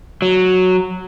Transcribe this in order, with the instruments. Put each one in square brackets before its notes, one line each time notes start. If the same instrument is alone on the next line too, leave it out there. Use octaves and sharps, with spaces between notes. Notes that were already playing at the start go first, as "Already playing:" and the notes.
[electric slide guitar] F#3